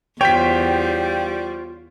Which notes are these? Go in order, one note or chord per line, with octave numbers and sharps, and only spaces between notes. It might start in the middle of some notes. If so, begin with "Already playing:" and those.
E2 G3 F4 C5 C#5 G5 B6